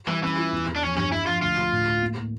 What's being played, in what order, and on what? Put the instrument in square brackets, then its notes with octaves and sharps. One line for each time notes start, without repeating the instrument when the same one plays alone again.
[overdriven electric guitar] E3 [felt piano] G3
[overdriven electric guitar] E3 [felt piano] C#4
[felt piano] F4
E2
E2
[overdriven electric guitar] D4
[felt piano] F3 [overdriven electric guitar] C#4
[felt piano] G2 [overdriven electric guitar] C#4
[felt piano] D4 [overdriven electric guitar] E4
[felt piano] F3 [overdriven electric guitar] F4
[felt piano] D2 [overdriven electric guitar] F4
[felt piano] D2
A2
A2
A#3
A2